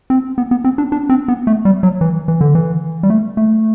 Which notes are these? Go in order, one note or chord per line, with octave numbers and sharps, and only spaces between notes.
C4
B3
B3
C4
D4
D4
C4
B3
A3
G3
F#3
E3
E3
D3
E3
G3
A3
A3